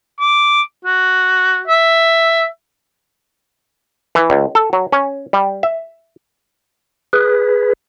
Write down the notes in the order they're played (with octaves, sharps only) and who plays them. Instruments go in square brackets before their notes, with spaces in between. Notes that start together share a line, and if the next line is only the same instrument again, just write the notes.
[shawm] D6
F#4
E5
[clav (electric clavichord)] E3
C#2
A4
F#3
C#4
G3
E5
[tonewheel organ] G#4 B4